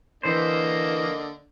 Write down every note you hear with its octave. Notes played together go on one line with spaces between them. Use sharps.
D3 E3 A#3 C5 D#5